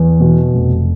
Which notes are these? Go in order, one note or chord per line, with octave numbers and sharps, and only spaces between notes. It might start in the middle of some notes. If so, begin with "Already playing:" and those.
Already playing: E2
B2
F1